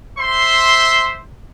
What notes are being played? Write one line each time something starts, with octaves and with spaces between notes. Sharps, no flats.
C5 E5 C6